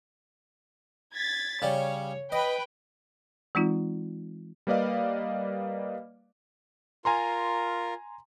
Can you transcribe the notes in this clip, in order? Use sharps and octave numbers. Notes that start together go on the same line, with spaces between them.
G#6 A6 B6
C#3 G3 C#5
B4 D#5 G5
E3 G#3 C4 D#4 F4
G3 A#3 B4 D5 D#5 F5
F4 A#4 G#5 A#5 C6